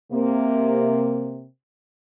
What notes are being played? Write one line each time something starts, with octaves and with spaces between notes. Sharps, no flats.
C3 A#3